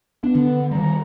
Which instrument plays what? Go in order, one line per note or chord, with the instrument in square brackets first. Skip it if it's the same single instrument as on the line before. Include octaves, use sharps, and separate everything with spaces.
[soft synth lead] B3 [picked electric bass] D4
[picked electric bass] D3
[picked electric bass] D#3 G3 [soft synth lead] A#5